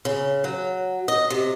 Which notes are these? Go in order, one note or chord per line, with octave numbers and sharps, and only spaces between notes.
C#3
F#3
D#5
C3